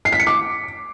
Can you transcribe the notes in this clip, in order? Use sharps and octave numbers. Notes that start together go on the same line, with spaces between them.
C7
B6
C#7
D6